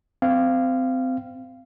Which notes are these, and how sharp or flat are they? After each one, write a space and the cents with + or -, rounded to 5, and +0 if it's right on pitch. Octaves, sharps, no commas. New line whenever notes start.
C4 -25 F5 -15